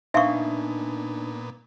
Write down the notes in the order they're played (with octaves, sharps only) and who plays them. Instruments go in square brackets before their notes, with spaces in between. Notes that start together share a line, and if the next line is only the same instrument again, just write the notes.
[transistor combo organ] A#2 B3 [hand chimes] D4 D#4 [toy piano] E5 C#6 [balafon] F5 C6